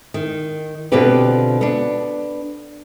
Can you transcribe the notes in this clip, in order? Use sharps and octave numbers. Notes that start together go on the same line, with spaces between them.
D#3
B2 D3 C4 F4 G4 B4
B3 D4